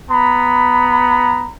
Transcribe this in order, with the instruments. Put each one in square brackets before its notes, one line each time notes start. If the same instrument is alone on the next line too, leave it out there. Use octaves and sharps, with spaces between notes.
[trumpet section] B3 A#5 B5